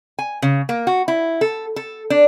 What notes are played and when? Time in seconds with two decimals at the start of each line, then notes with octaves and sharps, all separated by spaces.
0.19 G#5
0.42 C#3
0.69 A#3
0.87 F#4
1.08 E4
1.41 A4
1.76 A4
2.10 D4